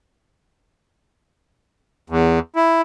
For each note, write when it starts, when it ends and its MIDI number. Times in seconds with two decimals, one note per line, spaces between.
2.10 2.39 40
2.56 2.82 64